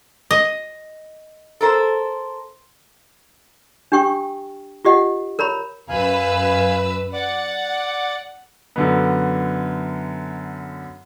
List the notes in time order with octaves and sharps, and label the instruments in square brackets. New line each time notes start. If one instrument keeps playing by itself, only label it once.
[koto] D#5
[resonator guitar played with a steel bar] A4 A#4 C5
[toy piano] D4 G4 G5 C#6 D#6
F4 G4 D#5 F#5
A#4 C#5 A#5 B5
[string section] F#2 B4 E6 [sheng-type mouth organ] F5 G#5
[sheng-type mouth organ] D5 D6 [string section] F#5
[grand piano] F#2 D3 B3